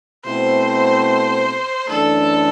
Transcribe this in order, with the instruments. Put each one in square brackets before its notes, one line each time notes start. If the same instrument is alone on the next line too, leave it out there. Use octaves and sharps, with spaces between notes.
[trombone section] B2 A3 C4 E4 [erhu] C5
[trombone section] F#2 E3 A3 D4 [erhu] A4